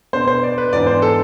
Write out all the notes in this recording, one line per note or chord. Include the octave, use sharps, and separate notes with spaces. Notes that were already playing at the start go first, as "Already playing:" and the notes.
B2 B3 D4 C5
C5
D5
B4
G#2 E3 B3 D4 D5
C5
A4